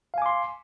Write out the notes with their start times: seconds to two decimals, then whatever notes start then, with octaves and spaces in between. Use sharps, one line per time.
0.14 F5
0.18 G#5
0.22 D6
0.26 C6